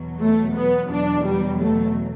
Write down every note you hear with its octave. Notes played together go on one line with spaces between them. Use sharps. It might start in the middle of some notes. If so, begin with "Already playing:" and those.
Already playing: E2 B2 F#3
A3
B3
E2 B2 F#3 D4
G3
A3